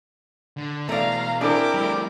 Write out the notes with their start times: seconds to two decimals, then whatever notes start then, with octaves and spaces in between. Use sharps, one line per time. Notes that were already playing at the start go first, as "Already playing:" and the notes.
0.57 D3
0.89 B2 E3 A3 D5 F5 A#5
1.41 C4 D4 E4 G#4 A#4 G5 D6
1.74 G3 A3